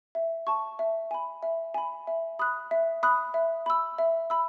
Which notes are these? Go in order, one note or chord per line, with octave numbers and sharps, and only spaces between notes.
E5
A5 C#6
E5
G#5 B5
E5
G#5 B5
E5
B5 D#6 F#6
E5
B5 D#6 F#6
E5
B5 E6
E5
B5 E6